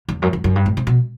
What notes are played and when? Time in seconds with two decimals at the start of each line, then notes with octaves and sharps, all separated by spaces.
0.09 E2
0.22 F#2
0.33 E2
0.44 F#2
0.56 G2
0.66 A2
0.77 C3
0.87 B2